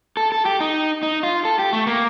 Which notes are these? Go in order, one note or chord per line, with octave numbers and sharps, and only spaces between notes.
A4
A4
G4
D#4
D#4
F4
A4
G4
A3
A#3